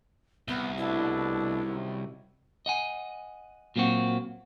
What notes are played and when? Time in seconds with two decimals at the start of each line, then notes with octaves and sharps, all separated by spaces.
0.48 C2 B3
0.78 B2 A3 D4 E4
1.65 F#2 D#3
2.66 D#5 F#5 G#5
3.76 A#2 F#3 A#3 C4 F#4